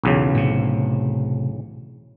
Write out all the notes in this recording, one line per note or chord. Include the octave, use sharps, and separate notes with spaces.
B1 E2 C#3
A2 C3